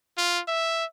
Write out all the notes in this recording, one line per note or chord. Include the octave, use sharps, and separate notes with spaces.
F4
E5